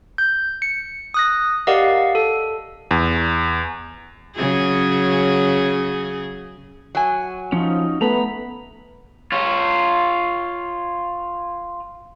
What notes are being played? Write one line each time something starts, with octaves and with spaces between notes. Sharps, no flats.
G6
C#7
D#6 F#6 A#6
G4 A#4 D5 D#5 F5 F#5
A4
E2
C#3 F#3 G#4
F#3 G#5
F3 C#4 D#4
A3 B3 A#5 B5
F4 C#5